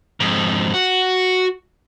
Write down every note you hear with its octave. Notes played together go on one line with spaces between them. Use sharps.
F2 G#2
F#4